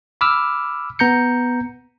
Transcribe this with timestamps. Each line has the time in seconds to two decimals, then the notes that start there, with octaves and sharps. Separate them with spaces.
0.21 B5 D6 E6 F6
0.99 B3 A#5 G6 C#7